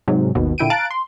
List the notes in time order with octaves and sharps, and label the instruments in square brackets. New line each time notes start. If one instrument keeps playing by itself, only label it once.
[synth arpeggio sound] G#2 C3 F#3
G#1 D#2 B2
A#2 D3 E4 G5 D7 D#7
F5 A5 A#5 F#6 A6 D7
C6